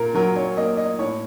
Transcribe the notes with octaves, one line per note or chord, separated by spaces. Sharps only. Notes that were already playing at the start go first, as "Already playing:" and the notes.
Already playing: A#2 A#4
F#3 A#4
C#5
A#3 D#5
D#5
A2 C#5